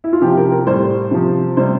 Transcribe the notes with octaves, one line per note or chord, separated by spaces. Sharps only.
E4
F4
C3 F3 G4
A#4
A#4
A2 G3 C5
C3 F3
C3 G3 C5